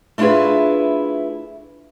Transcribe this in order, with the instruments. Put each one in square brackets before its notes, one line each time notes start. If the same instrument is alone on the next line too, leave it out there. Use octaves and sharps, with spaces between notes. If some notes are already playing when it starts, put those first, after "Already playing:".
[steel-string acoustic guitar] A3 D4 E4 F4 G#4 B4